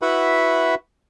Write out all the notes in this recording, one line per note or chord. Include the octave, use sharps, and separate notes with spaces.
E4 F#4 B4 E5 F#5 B5